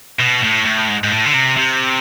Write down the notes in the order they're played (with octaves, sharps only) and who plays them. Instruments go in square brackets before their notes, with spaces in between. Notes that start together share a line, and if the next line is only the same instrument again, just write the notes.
[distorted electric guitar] B2
A2
A2
G#2
G#2
A2
D3
C3
C3